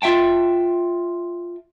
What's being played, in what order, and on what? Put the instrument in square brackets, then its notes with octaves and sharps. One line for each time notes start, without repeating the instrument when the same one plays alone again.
[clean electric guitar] F4 E5 G5 A5